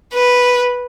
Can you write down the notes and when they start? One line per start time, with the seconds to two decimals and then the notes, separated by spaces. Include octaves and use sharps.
0.14 B4